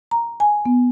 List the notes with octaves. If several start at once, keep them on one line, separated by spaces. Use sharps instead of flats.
A#5
G#5
B3